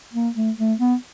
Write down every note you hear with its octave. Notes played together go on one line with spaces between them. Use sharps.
A#3
A3
A3
B3